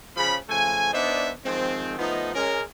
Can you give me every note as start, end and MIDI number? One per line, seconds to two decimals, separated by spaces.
0.17 0.37 49
0.17 0.37 53
0.17 0.37 83
0.49 0.92 49
0.49 0.92 53
0.49 0.92 57
0.49 0.92 80
0.94 1.30 59
0.94 1.30 62
0.94 1.30 63
0.94 1.30 72
0.94 1.30 74
0.94 1.30 76
1.44 1.95 51
1.44 1.95 53
1.44 1.95 56
1.44 1.95 60
1.99 2.30 53
1.99 2.30 57
1.99 2.30 59
1.99 2.30 63
2.35 2.62 56
2.35 2.62 61
2.35 2.62 70